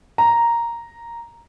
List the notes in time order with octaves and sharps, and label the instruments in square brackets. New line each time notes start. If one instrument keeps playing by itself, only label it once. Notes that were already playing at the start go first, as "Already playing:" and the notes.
[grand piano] A#5